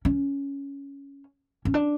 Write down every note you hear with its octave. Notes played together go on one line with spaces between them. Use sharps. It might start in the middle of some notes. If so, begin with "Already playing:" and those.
C#4
C#4
D4